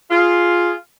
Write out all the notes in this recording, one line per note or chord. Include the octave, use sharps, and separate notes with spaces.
F4 G#4